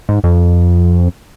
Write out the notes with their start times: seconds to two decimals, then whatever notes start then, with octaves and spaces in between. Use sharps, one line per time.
0.09 G#2
0.24 F2